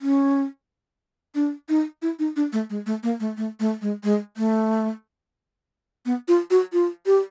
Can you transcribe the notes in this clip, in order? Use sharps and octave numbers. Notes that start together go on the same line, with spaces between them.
C#4
D4
D#4
E4
D#4
D4
A3
G#3
A3
A#3
A3
A3
A3
G#3
G#3
A3
B3
F4
F#4
F4
G4